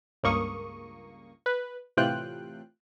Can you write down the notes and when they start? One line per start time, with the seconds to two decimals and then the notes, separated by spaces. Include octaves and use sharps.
0.23 C#2 G2 A#3 C#6 D#6
1.46 B4
1.97 A2 C3 E3 F4 G5 F#6